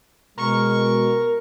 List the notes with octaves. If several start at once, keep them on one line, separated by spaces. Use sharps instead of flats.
B2 G#3 A#4 C#6